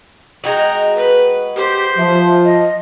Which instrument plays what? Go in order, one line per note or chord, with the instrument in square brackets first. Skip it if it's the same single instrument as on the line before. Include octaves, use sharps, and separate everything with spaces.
[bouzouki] G#3 D#4 F#4 [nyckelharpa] G5 A#5
[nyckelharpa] B4
[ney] G4 [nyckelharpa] C5
[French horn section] F3 [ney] E5
[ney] D#5